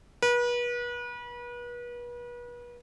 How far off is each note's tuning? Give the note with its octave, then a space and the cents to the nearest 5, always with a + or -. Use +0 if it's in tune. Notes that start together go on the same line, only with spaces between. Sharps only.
B4 -35